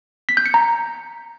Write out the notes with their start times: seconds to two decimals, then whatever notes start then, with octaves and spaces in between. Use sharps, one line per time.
0.29 B6
0.37 G6
0.46 C#7
0.54 A#5